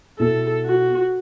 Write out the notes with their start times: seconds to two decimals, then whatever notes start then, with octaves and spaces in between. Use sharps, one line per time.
0.19 B2 B3 E4 A4
0.66 F#4